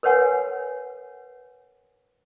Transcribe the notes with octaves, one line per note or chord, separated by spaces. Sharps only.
A#4 B4 C#5 F#5 G#5